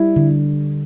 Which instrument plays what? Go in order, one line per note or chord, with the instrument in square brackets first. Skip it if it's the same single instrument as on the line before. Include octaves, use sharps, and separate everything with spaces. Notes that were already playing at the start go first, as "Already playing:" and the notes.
Already playing: [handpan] G3 [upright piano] E4
[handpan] D3